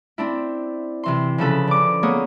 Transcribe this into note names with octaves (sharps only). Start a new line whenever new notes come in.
C4 D4 E4
C3 E3 C6
C#3 F3 A4 B4
D3 D6
A#3 B3 G#4 C#5 D#6